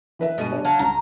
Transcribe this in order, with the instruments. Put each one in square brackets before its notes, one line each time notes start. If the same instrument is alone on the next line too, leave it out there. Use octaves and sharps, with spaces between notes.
[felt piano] E3 B4 E5
[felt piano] G2 G#3 D#7 [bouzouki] B2
[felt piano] D4 C#5 D5
[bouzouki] F#3 F5 A5
[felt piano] C#2 [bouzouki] A#5